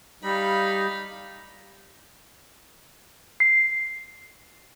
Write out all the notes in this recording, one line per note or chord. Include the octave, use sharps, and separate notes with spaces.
G3 D#4 F5 B5
C7